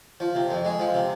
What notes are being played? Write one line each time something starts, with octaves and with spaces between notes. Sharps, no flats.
F3
C3
F2
G#3
F3
C3